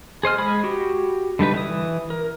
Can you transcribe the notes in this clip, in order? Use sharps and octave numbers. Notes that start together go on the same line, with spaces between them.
G#4 C5 D#5 F6
G#3 G#4 B5 D#6
F#4 G4
D3 G3 D#4 B4
E3 D#6
A#4